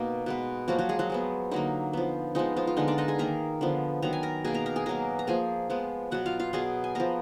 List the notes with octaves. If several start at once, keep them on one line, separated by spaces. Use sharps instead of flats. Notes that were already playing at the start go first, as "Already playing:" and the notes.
Already playing: B2 A#3 D#4 F#4
B2 G#3 B3
F3 F#3 A#3 F#4
F#3 F#4
G#3 G#4
F#3 F#4
F3 G#3 B3
D3 F#3 A#3 D#4
F3 B3
F3 G#3 B3 D#4
F3 F4
F4
D3 G#3 B3 D#4
D4 D5
D#4 D#5
G#4 G#5
D#3 A#3 A#4 A#5
D3 F3 B3
D#3 F#3 B3 A#5
G#5
A#4 A#5
B2 A#3 G#4 G#5
A#4 A#5
A#4 A#5
G#4 G#5
B2 F#3 A#3 A#4 A#5
A#5
F3 A#3 G#4 G#5
F3 G#3 B3
B2 F#3 B3 F#4 F#5
F4 F5
F4 F5
B2 F#3 B3 G#4 G#5
G#5
F3 B3 A#4 A#5